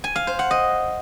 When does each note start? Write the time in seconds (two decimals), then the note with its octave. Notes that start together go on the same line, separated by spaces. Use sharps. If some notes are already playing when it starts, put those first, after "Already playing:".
0.04 G#5
0.16 F5
0.27 C5
0.39 F#5
0.51 D#5